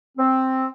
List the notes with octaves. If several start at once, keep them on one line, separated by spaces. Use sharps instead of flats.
C4